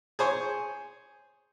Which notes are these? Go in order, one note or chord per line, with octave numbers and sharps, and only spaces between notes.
G#4 C5 C#5